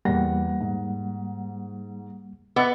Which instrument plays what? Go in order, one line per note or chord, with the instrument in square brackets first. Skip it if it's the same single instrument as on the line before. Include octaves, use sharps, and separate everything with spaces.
[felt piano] E2 A#6 [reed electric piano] G3 A#3 F#5
[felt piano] G#2
[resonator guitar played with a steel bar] B3 [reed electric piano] D#5 [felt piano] D6 E6 A6